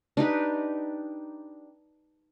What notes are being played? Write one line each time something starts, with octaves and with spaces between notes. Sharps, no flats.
D4 D#4 G4 B4